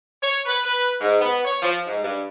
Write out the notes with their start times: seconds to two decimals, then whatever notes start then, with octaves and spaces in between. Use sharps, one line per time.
0.22 C#5
0.46 B4
0.64 B4
1.01 G#2
1.21 B3
1.45 C#5
1.63 F3
1.87 G#2
2.03 G2